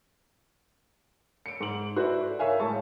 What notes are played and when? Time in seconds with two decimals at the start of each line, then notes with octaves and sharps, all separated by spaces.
1.46 C#7 D7
1.60 G#2 F#7
1.96 E4 F#4 A4 B4 C5 D5
2.39 A#4 C#5 E5 F5 G#5
2.60 A2 G#3 A5 C#6